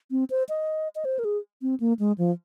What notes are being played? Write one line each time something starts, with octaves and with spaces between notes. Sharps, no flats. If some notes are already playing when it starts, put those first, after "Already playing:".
C4
C5
D#5
D#5
C5
A#4
G#4
C4
A#3
G#3
F3